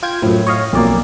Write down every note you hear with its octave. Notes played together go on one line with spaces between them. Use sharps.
F4 G5 G#6
F#2 A2 F3
C#5 D#5 F5
B1 F2 A#3 D5